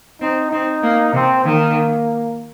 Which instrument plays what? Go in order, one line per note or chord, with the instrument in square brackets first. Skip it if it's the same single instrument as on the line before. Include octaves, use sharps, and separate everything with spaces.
[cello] C4 [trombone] D#4
[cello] C4 [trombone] D#4
[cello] A#3
[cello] C3 [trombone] C4
[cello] D#3 [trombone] A#3